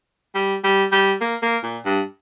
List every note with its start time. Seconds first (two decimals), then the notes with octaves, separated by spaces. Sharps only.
0.35 G3
0.64 G3
0.92 G3
1.21 A#3
1.42 A#3
1.63 A#2
1.85 G2